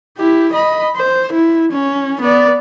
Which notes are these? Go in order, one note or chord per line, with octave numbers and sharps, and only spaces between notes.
E4 G4
D#5 B5
C5
E4
C#4
B3 D5